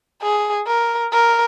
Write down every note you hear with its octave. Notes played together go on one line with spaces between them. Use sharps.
G#4
A#4
A#4